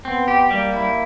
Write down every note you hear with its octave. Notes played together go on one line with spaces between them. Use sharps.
B3 C4
G4
G3 A#3
E4